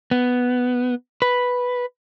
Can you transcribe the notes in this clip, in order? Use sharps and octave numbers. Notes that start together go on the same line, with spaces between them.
B3
B4